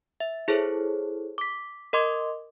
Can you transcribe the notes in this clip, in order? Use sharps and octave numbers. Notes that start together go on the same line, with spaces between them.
E5
E4 G#4 A4 C5 C#5
D6 B6
A#4 D#5 C6 D6 G#6